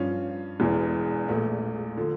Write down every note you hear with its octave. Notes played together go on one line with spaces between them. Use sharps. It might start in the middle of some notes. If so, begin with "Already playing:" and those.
Already playing: G2 F3 C#4 F4
E1 E2 E3
A#1 A#2 A3
D3 F3